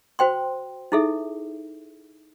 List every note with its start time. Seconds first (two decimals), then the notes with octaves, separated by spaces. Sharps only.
0.19 F#4 C5 G5 C6
0.92 D#4 E4 G#4 A4 E5